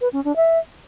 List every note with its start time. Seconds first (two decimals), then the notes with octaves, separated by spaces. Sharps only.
0.01 B4
0.13 C#4
0.24 D4
0.36 E5